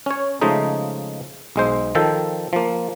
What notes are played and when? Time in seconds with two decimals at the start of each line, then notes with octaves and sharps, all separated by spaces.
0.06 C#4 C#5
0.41 C#3 F3 G#3 A3 D#4
1.56 B1 G#3 C5
1.95 D#3 F3 A4 G5
2.53 F3 A#3